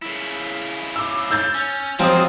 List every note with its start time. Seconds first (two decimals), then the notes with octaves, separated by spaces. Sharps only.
0.02 C#3 E4
0.96 D6 E6
1.31 E6 G6 A6
1.54 C#4
1.99 F3 F#3 G#3 A#3 C4 D#6